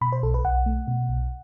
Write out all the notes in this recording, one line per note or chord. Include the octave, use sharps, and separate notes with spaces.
B2 B5
C5
B1 A4
B4
B1 F#5
A3
B2
B1